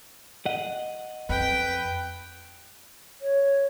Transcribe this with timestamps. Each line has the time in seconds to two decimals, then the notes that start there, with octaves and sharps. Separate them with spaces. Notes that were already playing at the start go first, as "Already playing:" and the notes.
0.46 D#5 F#5
1.29 F2 B4 G5
3.22 C#5